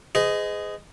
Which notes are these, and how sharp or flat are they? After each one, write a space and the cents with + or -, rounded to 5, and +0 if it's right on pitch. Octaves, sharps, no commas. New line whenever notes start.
G#4 +0 C5 -45 D#5 +0